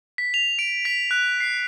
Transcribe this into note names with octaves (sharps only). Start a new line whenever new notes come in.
B6
F7
D7
B6
F#6
C7